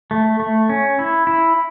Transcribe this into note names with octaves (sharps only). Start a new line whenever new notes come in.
A3
A3
C#4
E4
E4